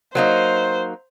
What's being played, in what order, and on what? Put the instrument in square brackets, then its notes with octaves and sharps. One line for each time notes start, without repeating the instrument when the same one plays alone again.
[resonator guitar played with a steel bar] F#3 A#3 D#4 [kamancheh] C5